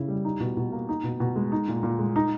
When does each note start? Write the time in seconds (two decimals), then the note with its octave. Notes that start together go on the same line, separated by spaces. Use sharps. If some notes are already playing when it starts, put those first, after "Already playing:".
Already playing: C#3 C#4 E4
0.08 G3
0.25 D#4
0.40 B2
0.57 B2
0.72 A#3
0.89 D#4
1.04 B2
1.20 B2
1.36 G#3
1.52 D#4
1.68 A#2
1.83 A#2
1.99 G#3
2.16 D#4